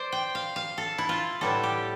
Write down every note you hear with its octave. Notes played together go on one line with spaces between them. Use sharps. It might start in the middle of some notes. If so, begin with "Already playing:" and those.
Already playing: C5 D5
G5
F5
F5
A4
E4
F4
A2 G3 B3 E4 A4
G4